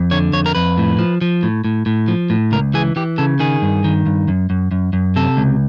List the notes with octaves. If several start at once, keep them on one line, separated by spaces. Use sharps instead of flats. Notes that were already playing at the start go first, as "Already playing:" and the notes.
Already playing: F2
D3 C#5
F2 C#5
A#4
F2 B4
A2
F3
F3
A2
A2
A2
F3
A2
C#2 A#4
E3 G#4
E3 G4
C#3 A4
D#3 G#4
G2
D#3
G2
F#2
F#2
F#2
F#2
C3 A4
C#2